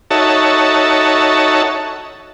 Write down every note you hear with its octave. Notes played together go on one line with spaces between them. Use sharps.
D#4 F#4 A4 C#5 E5 A5